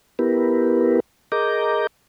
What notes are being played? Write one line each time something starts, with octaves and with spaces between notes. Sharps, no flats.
B3 E4 G4 A#4 B4
G#4 A#4 D#5 A#5 D6 G6